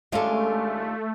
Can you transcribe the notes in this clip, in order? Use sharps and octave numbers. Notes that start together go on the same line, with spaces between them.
D#2 G#3 A3 C#4 D4 F4 A4